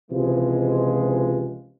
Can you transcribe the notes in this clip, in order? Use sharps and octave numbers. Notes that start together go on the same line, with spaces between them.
C#2 C3 E3 F3 G#3